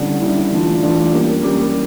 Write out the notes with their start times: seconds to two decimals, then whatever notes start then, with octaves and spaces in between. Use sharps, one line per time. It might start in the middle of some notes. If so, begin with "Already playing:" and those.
Already playing: D3 G3 C#4 E4
0.21 D3 G3 C#4 E4
0.51 E3 A3 D4 F4
0.82 E3 A3 D4 F4
1.12 G3 A#3 C#4 G4 A#4
1.43 G3 A#3 C#4 G4 A#4